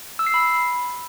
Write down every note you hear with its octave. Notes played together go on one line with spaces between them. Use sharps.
E6
C7
B5